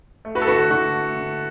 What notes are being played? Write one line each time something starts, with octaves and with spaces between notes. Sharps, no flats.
A3
F#4 B4
A4
D3 F#4 B4
F#4
D3 F#4
A3
D3